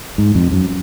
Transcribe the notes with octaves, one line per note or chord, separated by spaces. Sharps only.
G#2
F2
F#2